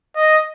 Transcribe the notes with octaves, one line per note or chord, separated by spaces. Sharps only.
D#5